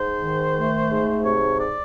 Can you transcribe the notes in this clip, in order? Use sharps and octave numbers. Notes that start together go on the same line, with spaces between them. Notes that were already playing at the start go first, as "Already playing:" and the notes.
Already playing: G#2 C5
D#3
A3
G#2
C3 C#5
D5